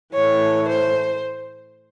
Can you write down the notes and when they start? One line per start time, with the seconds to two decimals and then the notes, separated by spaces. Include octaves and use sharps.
0.14 A2 E3 A3 C#5
0.69 C5